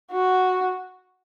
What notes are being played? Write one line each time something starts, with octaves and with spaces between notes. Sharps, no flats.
F#4